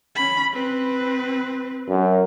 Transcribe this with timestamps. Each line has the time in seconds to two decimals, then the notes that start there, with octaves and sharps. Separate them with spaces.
0.15 C#4 B5
0.52 C4 B4
1.89 F#2